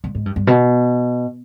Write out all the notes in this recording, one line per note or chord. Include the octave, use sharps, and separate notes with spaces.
G2
G#2
G2
G2
B2